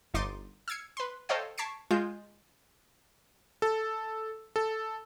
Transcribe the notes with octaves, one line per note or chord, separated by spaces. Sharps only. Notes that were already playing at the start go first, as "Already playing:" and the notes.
G1 D#4 C6 D6 A6 D#7
E6 F6 G#6 C7 C#7
B4 C6
A4 C5 C#5 D#5 F5 G5
A5 C#6 G#6 B6 C7 D7
G#3 F4 G6 E7
A4
A4